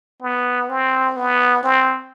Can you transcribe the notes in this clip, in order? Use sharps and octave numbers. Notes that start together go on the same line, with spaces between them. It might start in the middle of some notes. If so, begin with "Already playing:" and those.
B3
C4
B3
C4